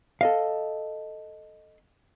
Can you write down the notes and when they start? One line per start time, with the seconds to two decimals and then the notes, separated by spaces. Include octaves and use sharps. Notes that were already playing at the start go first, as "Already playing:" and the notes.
0.21 A4 D#5 F5